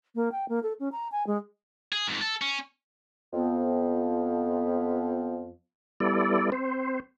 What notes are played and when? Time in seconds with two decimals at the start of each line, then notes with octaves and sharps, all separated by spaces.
0.15 A#3
0.32 G5
0.49 A#3
0.63 A4
0.80 C#4
0.92 A#5
1.12 G#5
1.27 G#3
1.92 G#4
2.08 F2 G#2
2.21 A4
2.42 C#4
3.33 F2 F3 B3
6.00 G3 B3 E4 A4 D5
6.52 C4 C5